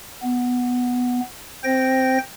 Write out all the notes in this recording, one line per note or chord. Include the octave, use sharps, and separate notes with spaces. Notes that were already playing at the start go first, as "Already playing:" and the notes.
B3
C4 C5 G5 A#6